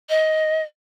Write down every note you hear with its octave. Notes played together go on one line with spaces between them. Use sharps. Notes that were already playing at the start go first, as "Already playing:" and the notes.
D#5